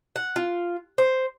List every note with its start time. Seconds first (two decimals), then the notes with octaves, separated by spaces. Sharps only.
0.16 F#5
0.36 F4
0.98 C5